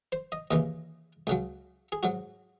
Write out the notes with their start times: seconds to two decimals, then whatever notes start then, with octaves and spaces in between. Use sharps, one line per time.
0.12 C5
0.32 D#5
0.51 D#2 C#3 E3 D#5
1.27 C#2 C#3 F#3
1.92 G#4
2.03 G#2 F#3 F#4